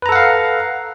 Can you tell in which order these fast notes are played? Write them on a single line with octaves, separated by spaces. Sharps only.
B4 A#5 A4 F#5 F5